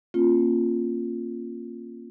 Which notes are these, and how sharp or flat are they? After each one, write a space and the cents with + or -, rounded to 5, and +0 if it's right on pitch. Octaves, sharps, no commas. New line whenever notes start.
A#3 +0 C#4 -40 F4 +5